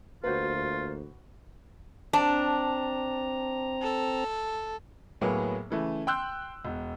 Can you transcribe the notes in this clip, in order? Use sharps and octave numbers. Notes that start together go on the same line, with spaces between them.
D2 A#3 F4 F#4 B4 C5
C4 D4 A5 A#5
A4
A2 F#3 A#3 B3 G#4
C#3 E3 A3
G5 C6 E6 F#6 G6
E1